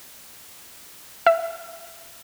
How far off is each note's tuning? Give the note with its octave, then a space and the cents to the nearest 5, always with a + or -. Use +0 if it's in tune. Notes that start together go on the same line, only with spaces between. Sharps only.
E5 +15